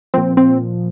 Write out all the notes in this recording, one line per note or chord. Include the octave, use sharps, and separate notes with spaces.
A#2 F3 C4
C4